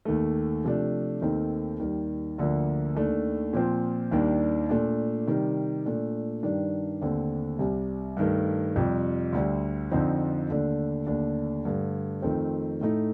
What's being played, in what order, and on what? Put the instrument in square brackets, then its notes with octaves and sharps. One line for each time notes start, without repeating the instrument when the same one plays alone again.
[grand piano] D#2 D#3 A3
C3 F3 A3 D4
D#2 D#3 A3 C4 D#4
D#2 D#3 G3
D2 D3 F3 A#3 D4
D#2 D#3 A3 D4
A#2 F3 C4
D#2 D#3 G3 D4
A#2 A3 D4
C3 D#3 G3
A#2 A3 D4
G2 D#3 G3 D4
D#2 D3 A3 C4
C2 C3 G3
G2 D#3 A3
F2 C3 G3
D2 D3 G3
F2 D3 F3 C4 D#4
D#2 D3 A3 D4
D#2 D3 A3 D4
G2 D3 A3
F2 D#3 A3 C4
A2 A3 D#4